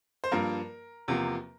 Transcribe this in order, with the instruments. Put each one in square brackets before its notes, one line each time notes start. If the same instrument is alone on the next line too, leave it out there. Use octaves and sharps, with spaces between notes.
[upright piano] C5
G2 F3 A#3 A#4
E2 C3 F3 A#3